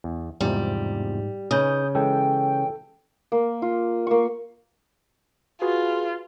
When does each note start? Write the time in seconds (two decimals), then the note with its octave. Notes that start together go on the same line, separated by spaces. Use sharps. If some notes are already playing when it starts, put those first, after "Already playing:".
0.04 E2
0.41 E2 G#2 C3 F3 G3 D#4
1.51 C#3 D#4 B4 D#6 G6
1.95 E3 G#3 C#4 A4 G5
3.32 A#3
3.62 F4
4.07 A#3 C#6
5.62 F4 F#4 G#4 B4